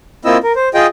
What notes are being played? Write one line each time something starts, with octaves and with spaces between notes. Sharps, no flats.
A#3 C4 E4 F4 D#5 E6
A#4
C5
F4 G#4 D#5 G5